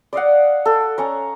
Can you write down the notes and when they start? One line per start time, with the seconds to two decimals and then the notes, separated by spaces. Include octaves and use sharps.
0.13 D5 D#5 F5 F#5
0.66 A4
0.98 C#4 C#5 A#5